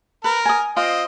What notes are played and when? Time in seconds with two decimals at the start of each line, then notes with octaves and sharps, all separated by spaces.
0.24 A#4 B4
0.45 G#5 D#6
0.77 C4 F4 D#5